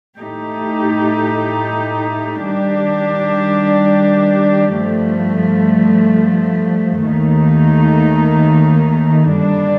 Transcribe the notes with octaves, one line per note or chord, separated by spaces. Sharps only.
A2 A3 D#4 G4
D#3 G3 D4 G4
G2 F3 A3
D#2 D#3 A3 D#4
G2 D3 G3 D4